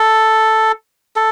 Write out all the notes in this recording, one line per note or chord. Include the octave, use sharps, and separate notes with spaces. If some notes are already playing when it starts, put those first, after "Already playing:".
Already playing: A4
A4